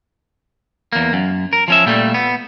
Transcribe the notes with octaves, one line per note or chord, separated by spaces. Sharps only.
E2 A#3
F#2
A#4
F3 C#4 E5
A#2 G3 A3
B3